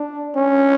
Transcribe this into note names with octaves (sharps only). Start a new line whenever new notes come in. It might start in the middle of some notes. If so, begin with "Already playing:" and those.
Already playing: D4
C#4